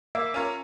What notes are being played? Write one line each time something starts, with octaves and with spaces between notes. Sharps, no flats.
A#3 E5
C#4 F4 A#4 C#5